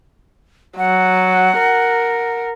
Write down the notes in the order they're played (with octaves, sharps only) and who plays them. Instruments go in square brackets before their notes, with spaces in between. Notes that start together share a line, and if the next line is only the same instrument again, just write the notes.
[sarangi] F#3 [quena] F#5
[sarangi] A#4